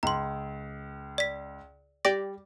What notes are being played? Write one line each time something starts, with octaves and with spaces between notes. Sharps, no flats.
C#2 A#5 C6
D5 B6
G3 G4 D5 A#6